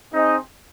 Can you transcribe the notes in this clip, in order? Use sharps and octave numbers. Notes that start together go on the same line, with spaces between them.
C4 D#4 G#4 D#5